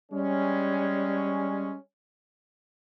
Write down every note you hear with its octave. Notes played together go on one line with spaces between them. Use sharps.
G3 G#3 C#4